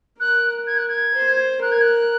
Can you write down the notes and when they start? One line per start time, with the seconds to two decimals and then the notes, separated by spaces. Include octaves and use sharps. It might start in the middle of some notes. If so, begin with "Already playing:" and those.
0.20 A#4 F#6
0.67 G#6
0.78 F#6
0.89 G#6
1.15 C5
1.61 A#4 F#6
1.72 G#6
1.81 F#6